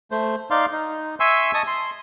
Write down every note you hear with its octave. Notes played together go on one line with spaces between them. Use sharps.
A3 C5
D#4 D5 F5 C6
D#4
E5 G#5 C6 C#6 E6
D#5 A5 C#6 D#6
C6